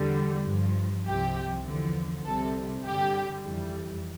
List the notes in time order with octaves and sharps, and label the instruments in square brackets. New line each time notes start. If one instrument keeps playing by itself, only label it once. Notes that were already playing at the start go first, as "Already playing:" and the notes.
Already playing: [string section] E2 D3 G3
G2 F3
C2 C3 F3 G4
E2 D3 F3
C2 C3 G3 A4
G2 D3 G3 G4
F2 E3 G3